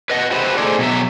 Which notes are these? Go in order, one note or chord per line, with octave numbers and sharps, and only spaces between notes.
B4 D#5 F#5
F#4 G4 B4 C5 E5
A3 D#4 G#4 A4 C5 D5
B2 F#3 E5